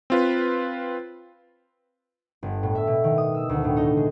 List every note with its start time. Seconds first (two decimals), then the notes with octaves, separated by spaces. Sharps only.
0.10 C4 F4 B4
2.43 G1
2.63 A2
2.75 E5
2.87 B2
3.04 D#3
3.18 D#6
3.34 E6
3.49 D2
3.64 A2
3.77 D#4
3.97 G#3